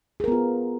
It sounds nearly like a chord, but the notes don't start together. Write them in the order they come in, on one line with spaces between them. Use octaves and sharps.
G#4 A#4 B3 F4